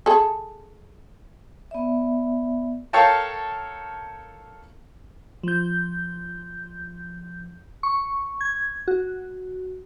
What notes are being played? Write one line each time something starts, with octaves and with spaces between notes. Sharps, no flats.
G#4 A4
B3 D5 E5
A4 A#4 C#5 F5 G5 A5
F3 G6
C#6
G#6
F#4